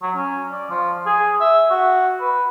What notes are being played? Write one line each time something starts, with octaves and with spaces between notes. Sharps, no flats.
F#3
C#4
D5
F3
G#4
E5
F#4
B4